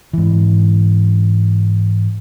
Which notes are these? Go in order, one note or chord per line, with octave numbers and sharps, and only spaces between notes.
G#2 E3